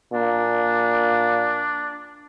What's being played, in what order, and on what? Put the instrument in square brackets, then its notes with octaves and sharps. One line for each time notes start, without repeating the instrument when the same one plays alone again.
[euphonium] A#2 [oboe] D4